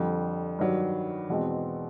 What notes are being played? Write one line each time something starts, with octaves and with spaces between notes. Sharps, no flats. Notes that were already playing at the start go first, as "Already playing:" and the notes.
Already playing: F2 D3 G3
G2 D#3 F#3
E2 B2 G#3 C4